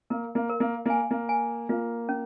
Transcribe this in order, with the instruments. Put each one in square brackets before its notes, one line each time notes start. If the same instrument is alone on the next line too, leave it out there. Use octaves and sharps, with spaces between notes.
[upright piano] A#3 [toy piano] A#4
[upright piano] A#3
[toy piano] A#4
[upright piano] A#3
[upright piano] A#3 [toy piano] G#5
[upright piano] A#3
[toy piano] G#5
[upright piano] A#3 [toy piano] F4
[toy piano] C#4